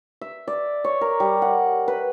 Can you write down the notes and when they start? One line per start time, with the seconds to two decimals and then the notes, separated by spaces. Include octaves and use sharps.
0.21 E5
0.48 D5
0.84 C#5
1.01 A#4
1.20 G3
1.42 F#5
1.88 B4